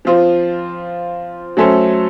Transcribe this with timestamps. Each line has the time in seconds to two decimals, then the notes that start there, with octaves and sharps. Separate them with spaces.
0.05 F3 C4 F4
1.57 F#3 A3 C#4 A4 C5